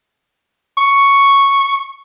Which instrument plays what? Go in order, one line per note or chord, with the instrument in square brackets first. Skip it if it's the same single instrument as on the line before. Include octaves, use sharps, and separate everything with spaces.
[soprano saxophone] C#6